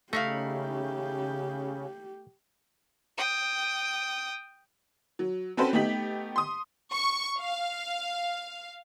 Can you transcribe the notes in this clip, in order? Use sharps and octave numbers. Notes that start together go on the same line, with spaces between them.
C#3 A3 D#4 E4 G4 F5
G5 D#6
F#3
C4 C#4 F#4 A4 B4 C5
A3 B3 D#4 G4 B6 F#7
C6 D#6
C#6
F5